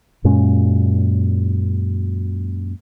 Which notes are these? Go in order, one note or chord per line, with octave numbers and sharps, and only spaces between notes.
F#2 A#2 G#3 C#4